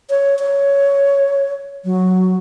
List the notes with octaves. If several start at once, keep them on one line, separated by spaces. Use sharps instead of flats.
C#5
C#5
F#3